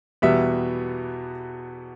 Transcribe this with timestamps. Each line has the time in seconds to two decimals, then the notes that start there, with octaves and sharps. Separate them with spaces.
0.22 E2 B2 G3 B3 E5